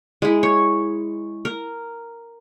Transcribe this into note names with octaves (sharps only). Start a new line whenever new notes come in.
G#3 E4
C#5
A#4